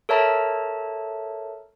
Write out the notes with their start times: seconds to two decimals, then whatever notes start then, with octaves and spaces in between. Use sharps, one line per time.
0.09 A4 A#4 C#5 E5 A5 A#5